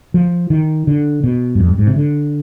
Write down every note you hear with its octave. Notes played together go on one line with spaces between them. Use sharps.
F3
D#3
D3
B2
G2
F2
G2
G#2
C3
D3